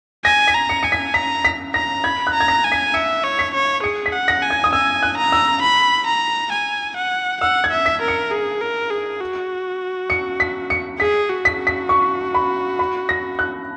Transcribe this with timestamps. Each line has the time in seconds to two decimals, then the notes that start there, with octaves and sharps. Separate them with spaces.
0.25 G#5 A#6
0.48 B6
0.54 A#5
0.69 C#7
0.83 G#5 C#7
0.92 B6
1.14 A#5 B6
1.45 B6
1.74 A#5 A#6
2.04 B5 G#6
2.27 F#6
2.34 A#5
2.40 G#6
2.48 A#6
2.64 G#5
2.72 B6
2.94 E5 C#7
3.24 C#5
3.39 B6
3.54 C#5
3.83 G#4 C#7
4.06 B6
4.12 F#5
4.28 A#6
4.42 G#5
4.50 G#6
4.64 D#6
4.73 G#5 E6
5.03 F#6
5.17 A#5
5.32 E6
5.62 B5
6.07 A#5
6.52 G#5
6.97 F#5
7.41 F#5 E6
7.64 G#6
7.71 E5
7.86 B6
8.02 A#4
8.08 C#7
8.31 G#4
8.61 A#4
8.91 G#4
9.21 F#4
10.10 C#7
10.40 B6
10.70 C#7
10.99 G#4 B6
11.29 F#4
11.45 B6
11.59 F#4
11.67 B6
11.89 C#6
12.34 B5
12.79 B5
13.09 A#6
13.39 F#6